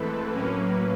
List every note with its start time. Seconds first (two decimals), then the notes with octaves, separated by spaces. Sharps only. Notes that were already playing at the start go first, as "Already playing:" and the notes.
Already playing: G#2 E3 A3 C4 A4 B4
0.31 A2 F#3 A#3 C#4